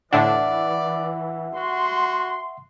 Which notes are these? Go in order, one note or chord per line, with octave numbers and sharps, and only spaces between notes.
A2 D3 E3 D4 D5 E5 F#5
F#4 C6